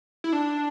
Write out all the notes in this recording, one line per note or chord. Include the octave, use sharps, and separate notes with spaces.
E4
D4